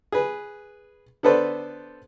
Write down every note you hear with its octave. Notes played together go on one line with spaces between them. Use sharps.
G#4 B4
D3 B3 A4 B4 C5 D5